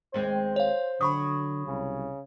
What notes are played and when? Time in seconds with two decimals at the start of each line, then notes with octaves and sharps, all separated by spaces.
0.14 D#2 G#3 C4 C5
0.56 C#5 F5
1.01 D3 F#3 B5 C#6 D#6
1.67 C2 C#3